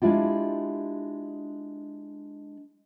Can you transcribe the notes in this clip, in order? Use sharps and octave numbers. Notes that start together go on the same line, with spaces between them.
G#3 D4 E4 F4 G4